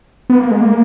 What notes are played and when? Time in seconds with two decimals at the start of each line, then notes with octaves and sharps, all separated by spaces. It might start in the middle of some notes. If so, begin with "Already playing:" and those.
0.30 B3
0.40 A#3
0.51 G#3
0.61 A#3